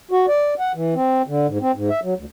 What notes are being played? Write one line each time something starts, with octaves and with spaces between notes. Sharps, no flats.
F#4
D5
F#5
E3
C4
D3
G#2
C4
G#2
E5
F#3
D2